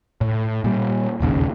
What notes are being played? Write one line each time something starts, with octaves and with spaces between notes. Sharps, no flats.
A2
A#2 G3
E1 A#1 D#2 C#3